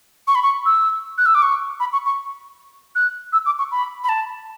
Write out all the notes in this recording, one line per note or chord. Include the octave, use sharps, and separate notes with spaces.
C#6
B5
C#6
E6
F#6
E6
D6
C#6
B5
C#6
C#6
F#6
E6
D6
C#6
B5
B5
A5